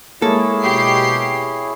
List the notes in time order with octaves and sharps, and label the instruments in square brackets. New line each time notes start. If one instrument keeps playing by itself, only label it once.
[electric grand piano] G#3 A#3 [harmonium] E4 G#4 C#5 [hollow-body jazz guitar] A4
[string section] B2 G4 C7